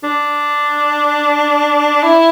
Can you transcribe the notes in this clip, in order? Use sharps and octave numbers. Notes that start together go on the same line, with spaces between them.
D4
E4